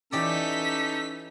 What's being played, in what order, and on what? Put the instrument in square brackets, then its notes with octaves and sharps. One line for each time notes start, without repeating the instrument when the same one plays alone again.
[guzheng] E3 G4 D5 [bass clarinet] C#4 [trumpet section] D#4 A4 [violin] B6